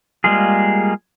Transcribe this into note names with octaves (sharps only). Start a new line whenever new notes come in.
G3 G#3 A#3 F4 G#4